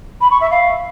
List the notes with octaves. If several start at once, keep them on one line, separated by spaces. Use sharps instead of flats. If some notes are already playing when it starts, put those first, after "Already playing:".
B5
C#6
E5
F5